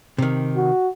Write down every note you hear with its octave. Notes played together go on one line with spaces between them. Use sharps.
C3 D#3
F#4